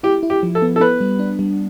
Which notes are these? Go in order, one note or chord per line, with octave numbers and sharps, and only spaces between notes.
E4 G4
E4
G4
F3
A4
B3
A4
B3 B4
G3
D4
G3